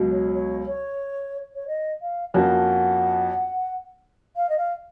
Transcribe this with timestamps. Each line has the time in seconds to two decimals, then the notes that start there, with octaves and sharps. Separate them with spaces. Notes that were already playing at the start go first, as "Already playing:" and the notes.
Already playing: C#2 B2 F#3
0.12 C#5
0.34 C#5
0.67 C#5
1.55 C#5
1.68 D#5
2.01 F5
2.34 F2 F3 A#3 C#4 F#4 F#5
4.36 F5
4.49 D#5
4.58 F5